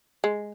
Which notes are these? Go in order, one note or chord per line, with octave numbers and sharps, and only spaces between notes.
G#3